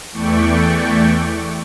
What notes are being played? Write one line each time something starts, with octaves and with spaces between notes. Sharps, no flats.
E2 E3 A3 D5 G5 C#6